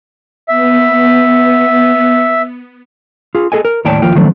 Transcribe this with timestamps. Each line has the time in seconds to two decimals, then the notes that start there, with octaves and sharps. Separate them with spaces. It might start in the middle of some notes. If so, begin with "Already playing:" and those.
0.48 B3 E5
3.35 F4 G#4
3.52 G#4 A4 D#5 G#5
3.65 A#4
3.85 D#2 A2 C#5 D5 G5 A5
4.02 D#2 F3 A#3 F4 G5
4.15 D#3 F3 F#3 A3 C4 D4